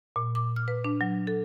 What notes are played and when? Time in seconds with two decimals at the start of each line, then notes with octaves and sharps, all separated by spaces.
0.16 A#2
0.35 D6
0.56 F6
0.68 B4
0.84 D4
1.01 F#3
1.27 A4